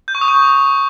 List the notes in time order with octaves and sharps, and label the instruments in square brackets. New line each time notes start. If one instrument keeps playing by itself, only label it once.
[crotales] G6
C#6
D#6
C#6